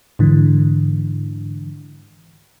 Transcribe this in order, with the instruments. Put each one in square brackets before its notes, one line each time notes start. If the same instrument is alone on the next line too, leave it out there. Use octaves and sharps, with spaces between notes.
[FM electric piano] G#2 D3 E3